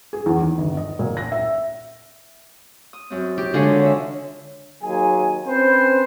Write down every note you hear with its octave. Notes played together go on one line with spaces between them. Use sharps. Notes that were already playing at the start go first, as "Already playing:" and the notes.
G#4
E2
D#2
G1
D#5
A#2
A#6
E5
D#6
F#2 C4
G4
D3 G#3 F4 G#4 C#5
C#5 E5
D#2 F#3 G#4 G#5
C4 C#4 B4 C5